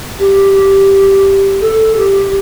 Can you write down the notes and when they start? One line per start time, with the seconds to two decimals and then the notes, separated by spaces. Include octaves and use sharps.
0.18 G4
0.53 G4
1.61 A4
1.96 G4